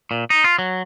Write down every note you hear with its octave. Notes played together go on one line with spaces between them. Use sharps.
A#2
D#4
F4
F#3